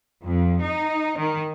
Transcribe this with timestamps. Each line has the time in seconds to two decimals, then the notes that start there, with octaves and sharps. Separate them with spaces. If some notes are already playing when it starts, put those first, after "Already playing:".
0.23 F2
0.60 D#4
1.17 D#3